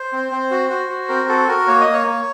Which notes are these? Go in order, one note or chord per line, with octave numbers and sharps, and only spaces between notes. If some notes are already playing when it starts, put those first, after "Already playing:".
Already playing: C5
C4
C4
F#4
F#4
F#4
C4 A#4
F#4 A4
F#4 A#4
A#3 C#5
D#5
A#3
C#5
A#3